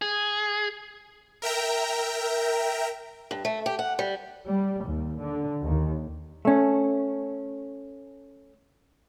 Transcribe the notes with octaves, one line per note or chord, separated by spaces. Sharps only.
G#4
A#4 E5 G5 A#5
G2
A3
G4
F#5
G3
G3
D#2
D3
D#2
A3 C#4